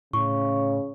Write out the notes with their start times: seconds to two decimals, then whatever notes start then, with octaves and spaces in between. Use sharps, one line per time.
0.13 A2 C#3 C#6